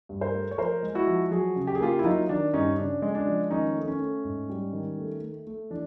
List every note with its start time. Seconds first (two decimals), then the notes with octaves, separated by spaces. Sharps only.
0.09 G2
0.21 A#4 C5
0.34 A3
0.51 C#5
0.58 F3 A#4 C5
0.83 G#3
0.95 E4 F#4
1.07 F3
1.31 F#3 F#4 G#4
1.56 C#3
1.67 G4
1.75 G#4
1.80 A#3 F4 G4
1.99 E4
2.04 F#3 D#4 F4
2.29 D#3 D4
2.53 G2 C#4 D#4
2.78 C#3 D4
3.02 G#3
3.15 D4
3.27 F3
3.51 D#3 C#4 D#4
3.76 A3
3.88 C#4
4.00 A3
4.24 G#2
4.49 G3
4.73 D#3
4.98 A3
5.22 A3
5.47 A3
5.70 E3 D4